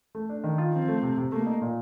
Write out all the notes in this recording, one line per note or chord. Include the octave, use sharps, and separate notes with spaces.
A3
D4
D#3
F4
F3 C4
A3
C3
C3
A3 A#3
D#4
A#2